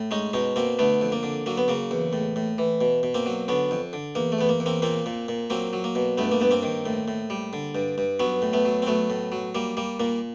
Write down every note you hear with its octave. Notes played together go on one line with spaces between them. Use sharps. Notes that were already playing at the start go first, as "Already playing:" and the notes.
Already playing: A2
G#3 C#4 D#4
B2 C#4 D#4
B2 A#3 C4
D3 A3 B3
F2
A#3
D3
F#3 A#3
B3
C#3 A#3
E2
A2
A2
E3
B2
B2
A#3 C4
F#3
D3 B3 C#4
F2
D3
E2 A#3
A3
E2 B3
A#3
E2
A#3 C4
A#2 A#3 C4
A#2
A#2
F#3 A#3 C4
F#3
A#3
B2
G2 A3 B3
A#3
G2 B3
A#3 C4
D#3
A2
A2
G3
D3
G2
G2
F#3 B3 C#4
A2
A3 B3
F#3
C4
F#3 A3 B3
A2
F#3
G3 A#3
G3 A#3
A#2 A#3